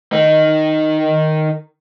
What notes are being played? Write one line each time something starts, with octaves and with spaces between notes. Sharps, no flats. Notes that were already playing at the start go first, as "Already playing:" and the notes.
D#3 D#4